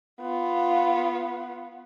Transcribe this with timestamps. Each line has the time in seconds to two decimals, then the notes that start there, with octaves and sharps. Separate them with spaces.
0.21 B3 F4